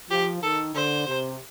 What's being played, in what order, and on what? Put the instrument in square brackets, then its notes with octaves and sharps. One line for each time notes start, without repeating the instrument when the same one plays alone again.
[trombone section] F3 [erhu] G4
[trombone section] D#3 [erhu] A4
[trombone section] D3 [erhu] C5
[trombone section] C3